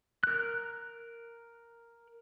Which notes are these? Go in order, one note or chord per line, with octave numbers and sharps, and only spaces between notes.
A#4 F#6